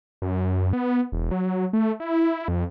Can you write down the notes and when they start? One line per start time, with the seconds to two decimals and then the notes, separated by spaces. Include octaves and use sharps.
0.22 F#2
0.73 B3
1.12 E1
1.31 F#3
1.73 A3
2.00 E4
2.48 F2